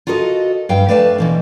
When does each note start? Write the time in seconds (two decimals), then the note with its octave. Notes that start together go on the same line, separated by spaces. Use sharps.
0.07 F4 F#4 A4 A#4 D#5
0.69 G2 F5 G5
0.88 A3 B4 D5 F5 F#5 A5
1.18 B2 E3 C4